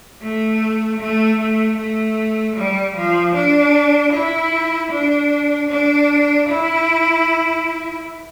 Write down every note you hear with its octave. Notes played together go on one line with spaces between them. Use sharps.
A3
A3
A3
A3
G3
F3
D4
E4
D4
D4
E4